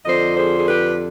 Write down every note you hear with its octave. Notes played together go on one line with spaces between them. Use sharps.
F2 D3 F3 C5 D#5
G#4 C5
G#4
G4 B4